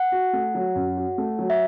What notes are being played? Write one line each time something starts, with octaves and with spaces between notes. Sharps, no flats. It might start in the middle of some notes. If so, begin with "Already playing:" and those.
Already playing: F#5
F#4
A3
F#3
F#2
F#4
A3
F#3
E5